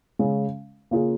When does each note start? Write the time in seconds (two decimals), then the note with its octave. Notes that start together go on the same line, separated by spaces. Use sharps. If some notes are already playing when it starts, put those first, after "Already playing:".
0.19 C#3 G#3 C#4
0.91 C#3 A#3 C#4 F4 G#4